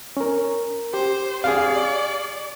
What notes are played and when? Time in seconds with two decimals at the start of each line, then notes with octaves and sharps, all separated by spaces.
0.17 C#4 A#4
0.94 G4 C5
1.44 G#4 D5 F5